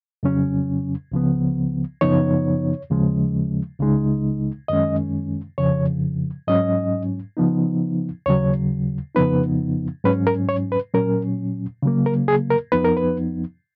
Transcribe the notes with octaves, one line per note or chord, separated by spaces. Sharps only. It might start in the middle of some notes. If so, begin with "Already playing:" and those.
F2 C#3 F#3 C#4
C#2 C#3 F3 B3
F#2 C#3 F3 B3 D#4 C#5
D#2 C#3 F3 G#3 C#4
C#2 C#3 G#3 D#4
F#2 D#3 G#3 C#4 D#5
F2 C#3 F3 C#5
G#2 F#3 C#4 D#5
C#3 F3 B3 D#4
D#2 C#3 F#3 C#5
F2 C#3 F3 B3 D#4 B4
G#2 F#3 C#4 B4
A#4
C#5
B4
A#2 F#3 C#4 A#4
C#3 F#3 A#3
A#4
G#4
A#4
F2 F3 B3 D#4 B4
A#4
B4